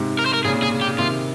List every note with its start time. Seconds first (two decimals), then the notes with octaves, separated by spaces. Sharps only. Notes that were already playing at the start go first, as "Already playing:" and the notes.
Already playing: G#2 C3
0.19 A#4
0.26 C5
0.34 A#4
0.45 A#2 C#3 G#4
0.63 G#4
0.81 G4
0.99 C3 D#3 F4